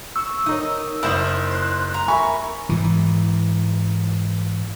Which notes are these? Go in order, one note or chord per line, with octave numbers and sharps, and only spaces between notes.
C#6 E6
D#4 A#4 C#5 D#5
F#1 E4 C5 D#6 G6
C6 F#6
A#5
A#4 E5 G#5 B5 C#6
G#2 E3